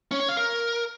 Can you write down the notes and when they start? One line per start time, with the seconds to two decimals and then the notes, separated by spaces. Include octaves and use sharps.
0.12 C#4
0.20 C#5
0.29 F5
0.37 A#4